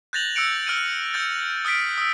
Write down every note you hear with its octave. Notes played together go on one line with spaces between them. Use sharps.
F#6 G6 A6 A#6 F7 F#7
E6 F#6 C#7 D7 F7
E6 F6 A6 D7 D#7
E6 G6 A6
D#6 F6 A6 B6 D7
D#6 E6